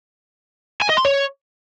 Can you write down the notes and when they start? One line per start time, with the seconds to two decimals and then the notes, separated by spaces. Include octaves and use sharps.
0.82 G#5
0.90 D#5
0.97 C6
1.05 C#5